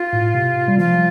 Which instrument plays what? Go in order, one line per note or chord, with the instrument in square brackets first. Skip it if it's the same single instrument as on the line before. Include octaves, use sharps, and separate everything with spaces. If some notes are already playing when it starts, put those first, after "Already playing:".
Already playing: [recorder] F4
[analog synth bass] A2
C3
G3
[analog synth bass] F3 [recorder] F4